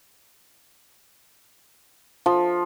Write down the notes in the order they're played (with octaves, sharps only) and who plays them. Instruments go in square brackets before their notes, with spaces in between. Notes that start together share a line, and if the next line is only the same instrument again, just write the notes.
[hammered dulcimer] F3